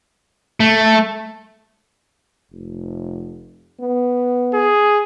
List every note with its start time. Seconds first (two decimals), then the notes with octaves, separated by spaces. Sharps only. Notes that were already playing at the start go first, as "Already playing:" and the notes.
0.60 A3
2.52 F1
3.80 B3
4.54 G#4